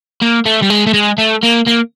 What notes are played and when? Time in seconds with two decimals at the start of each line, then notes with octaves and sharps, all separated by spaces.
0.21 A#3
0.45 A3
0.62 G3
0.70 G#3
0.87 A3
0.94 G#3
1.18 A3
1.43 A#3
1.67 A#3